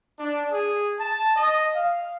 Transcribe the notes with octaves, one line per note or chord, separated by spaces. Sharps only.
D4
G#4
A5
D#5
F5